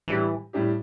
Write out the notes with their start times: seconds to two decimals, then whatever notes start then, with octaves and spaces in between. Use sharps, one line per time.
0.08 A2 E3 G3 D4 G4
0.53 A2 G3 D4 G4